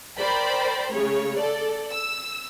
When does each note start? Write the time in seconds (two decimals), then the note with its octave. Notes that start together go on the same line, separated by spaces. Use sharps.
0.18 A#4 C5 D5 G5 B5
0.92 C#3 A3 C#5
1.36 A4 D5
1.91 E6